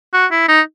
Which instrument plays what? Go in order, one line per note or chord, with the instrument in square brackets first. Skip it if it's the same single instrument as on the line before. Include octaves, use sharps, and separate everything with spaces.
[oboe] F#4
E4
D#4